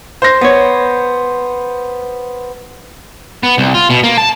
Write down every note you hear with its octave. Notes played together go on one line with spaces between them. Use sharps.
C5 A#6
B3 C#5
B3
C2
F4
B2
A#3
A5